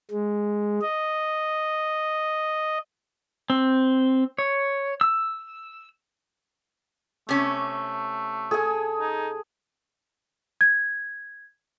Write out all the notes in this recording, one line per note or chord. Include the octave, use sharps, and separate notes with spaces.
G#3
D#5
C4
C#5
E6
C3 A3 C#4
G#4 A4 G#5
D#4
G#6